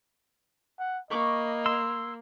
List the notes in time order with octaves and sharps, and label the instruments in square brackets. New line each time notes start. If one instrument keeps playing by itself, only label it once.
[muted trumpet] F#5
[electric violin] A#3 [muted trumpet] D#5 [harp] B5 C#6 D6
[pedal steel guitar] C6 E6